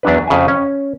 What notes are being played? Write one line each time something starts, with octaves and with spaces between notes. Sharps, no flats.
E2 F#3 D4 B4
F2 C#3 E5 G#5
C#4